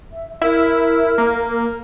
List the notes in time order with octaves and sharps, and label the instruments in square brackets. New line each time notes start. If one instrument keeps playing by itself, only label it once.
[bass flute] E5
[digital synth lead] E4 [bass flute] A#4
[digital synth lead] A#3